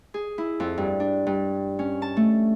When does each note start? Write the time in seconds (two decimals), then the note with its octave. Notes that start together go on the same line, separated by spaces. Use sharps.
0.14 G#4
0.38 E4
0.60 F2
0.78 G2
1.00 D4
1.27 G2
1.79 C#4
2.02 A5
2.17 A3